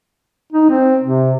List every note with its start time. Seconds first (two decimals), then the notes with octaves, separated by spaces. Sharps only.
0.53 D#4
0.70 C4
1.03 C3